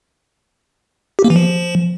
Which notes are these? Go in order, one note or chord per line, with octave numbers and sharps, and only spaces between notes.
G4
A#3
E3
F3